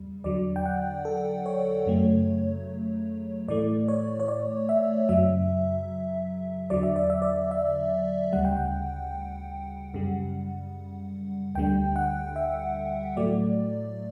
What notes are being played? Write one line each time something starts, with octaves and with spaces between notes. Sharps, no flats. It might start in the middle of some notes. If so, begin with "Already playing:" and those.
Already playing: E2 C#3 G3
E2 D3 F#3 D5
G5
F#5
A4
C#5
F#2 C#3 F#3 A3
A2 E3 A3 D5
C#5
C#5
D5
E5
F#2 C#3 F#3 E5
E2 D3 F#3 D5
E5
D5
E5
D5
E5
D2 C#3 G3 F#5
G5
F#5
F#2 C#3 G3
D2 D3 G3 G5
F#5
E5
A2 F#3 A3 D5